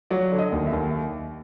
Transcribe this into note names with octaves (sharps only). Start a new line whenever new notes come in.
F#3 D5
D3
D#5
D#2
E5
D#2